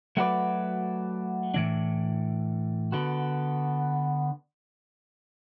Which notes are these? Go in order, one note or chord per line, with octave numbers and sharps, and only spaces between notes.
F#3 A3 F#4 B4 D5
A2 E3 D4
D3 B3 F#4